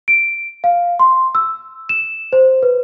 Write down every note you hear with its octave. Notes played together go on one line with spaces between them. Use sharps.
D7
F5
C6
E6
E7
C5
B4